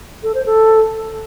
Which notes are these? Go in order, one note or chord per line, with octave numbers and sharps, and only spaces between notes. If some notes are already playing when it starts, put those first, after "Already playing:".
A4
C5
A4